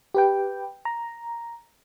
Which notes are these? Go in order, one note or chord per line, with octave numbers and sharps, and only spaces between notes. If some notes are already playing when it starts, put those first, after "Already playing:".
G4 B4 G5
A#5